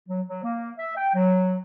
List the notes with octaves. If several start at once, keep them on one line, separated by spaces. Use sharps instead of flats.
F#3
F#3
A#3
E5
G5
F#3